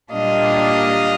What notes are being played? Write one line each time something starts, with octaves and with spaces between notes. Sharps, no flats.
A#2 G3 A#3 D4 D#5 F5